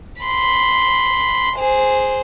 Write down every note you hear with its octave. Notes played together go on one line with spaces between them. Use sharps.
B5 C6
G#4 C5